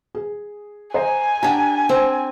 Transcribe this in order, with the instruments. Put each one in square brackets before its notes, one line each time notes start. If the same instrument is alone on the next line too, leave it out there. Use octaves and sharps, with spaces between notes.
[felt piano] G#4
[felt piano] C5 D#5 A#5 [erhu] G#5
[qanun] D4 G4 [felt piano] F#5 A5 A#5
[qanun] C4